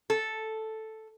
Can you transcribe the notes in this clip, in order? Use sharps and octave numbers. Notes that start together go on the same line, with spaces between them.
A4